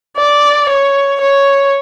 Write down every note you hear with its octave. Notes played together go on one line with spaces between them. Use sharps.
D5
C#5
C#5